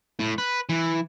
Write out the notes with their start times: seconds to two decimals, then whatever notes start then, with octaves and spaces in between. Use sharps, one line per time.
0.20 A2
0.38 B4
0.69 E3